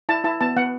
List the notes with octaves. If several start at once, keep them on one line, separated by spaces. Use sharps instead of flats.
E4 A5
E4 A5
B3 A5
B3 F#5